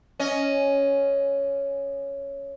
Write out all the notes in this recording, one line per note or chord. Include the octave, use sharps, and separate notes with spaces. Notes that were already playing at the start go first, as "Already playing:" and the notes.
C#4 D#5